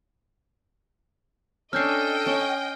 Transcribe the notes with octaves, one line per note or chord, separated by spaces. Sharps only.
C#4 D4 A4 D#5 G5 F6 G6 C7
C#4